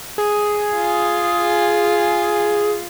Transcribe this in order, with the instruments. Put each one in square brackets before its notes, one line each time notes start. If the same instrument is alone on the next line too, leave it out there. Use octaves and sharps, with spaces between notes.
[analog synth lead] G#4
[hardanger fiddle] F4